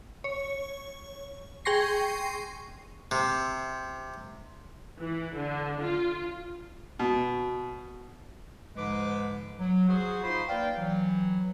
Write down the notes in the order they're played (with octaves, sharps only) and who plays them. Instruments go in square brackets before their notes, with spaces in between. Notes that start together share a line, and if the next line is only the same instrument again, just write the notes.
[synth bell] C#5
G#4 G5 C6 C#6 A#6 C7
[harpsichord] C3
[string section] E3
D3
F4
[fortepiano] B2
[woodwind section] G#2 D3 F3 G#3 B4 D6
F#3
F#4 G#4 C5
D#4 F4 C5 B5 C6
A#3 B4 D5 F5 G5
E3 F#3